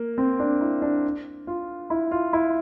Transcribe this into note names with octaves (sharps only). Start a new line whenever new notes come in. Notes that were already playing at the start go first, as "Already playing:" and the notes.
Already playing: A#3
C4
D4
E4
D4
F4
E4
F4
E4